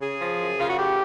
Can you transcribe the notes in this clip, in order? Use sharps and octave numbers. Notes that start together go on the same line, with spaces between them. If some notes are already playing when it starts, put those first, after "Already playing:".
C#3 G#4
F3
F#2
C#3 F4
F#4
A2 G4